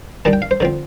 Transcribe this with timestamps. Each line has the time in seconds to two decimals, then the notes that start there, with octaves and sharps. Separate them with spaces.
0.25 D#3 G3 D4 A5
0.33 G5
0.42 F5
0.51 C5
0.60 D3 F3 C4